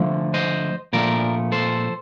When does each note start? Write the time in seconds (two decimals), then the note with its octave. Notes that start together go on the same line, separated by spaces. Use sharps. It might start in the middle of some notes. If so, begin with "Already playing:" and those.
Already playing: D3 F3 A3
0.34 C5 D#5
0.93 A#2 F3 A3 A#4 D5
1.52 A4 C5